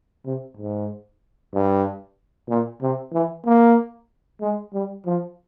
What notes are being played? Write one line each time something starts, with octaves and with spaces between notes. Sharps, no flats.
C3
G#2
G2
A#2
C3
E3
A#3
G#3
G3
F3